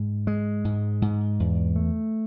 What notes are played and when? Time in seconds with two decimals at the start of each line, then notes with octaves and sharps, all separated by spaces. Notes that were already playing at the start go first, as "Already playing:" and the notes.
Already playing: G#2
0.27 G#3
0.65 G#2
1.02 G#2
1.40 E2
1.76 A3